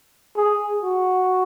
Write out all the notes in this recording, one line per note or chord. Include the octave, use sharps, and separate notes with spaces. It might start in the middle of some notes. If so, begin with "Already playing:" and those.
G#4
F#4